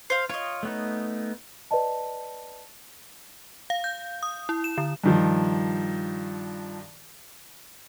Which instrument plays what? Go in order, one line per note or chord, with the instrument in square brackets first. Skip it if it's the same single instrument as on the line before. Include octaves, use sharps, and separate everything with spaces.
[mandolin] C5 F5
[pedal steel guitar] F4 [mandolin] C#5 D#5
[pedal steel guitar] A3 B3 D#4
[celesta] B4 D5 D#5 A5
[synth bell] F5
G6
D#6
E4
E7
D3
[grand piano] G2 D#3 F3